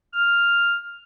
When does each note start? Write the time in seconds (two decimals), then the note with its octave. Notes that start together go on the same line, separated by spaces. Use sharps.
0.13 F6